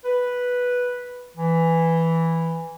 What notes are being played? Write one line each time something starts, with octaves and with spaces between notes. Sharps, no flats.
B4
E3